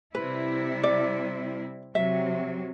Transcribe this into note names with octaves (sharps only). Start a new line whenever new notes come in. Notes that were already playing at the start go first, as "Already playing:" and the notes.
C3 G3 E4 B4
D5
C3 F#3 C4 E5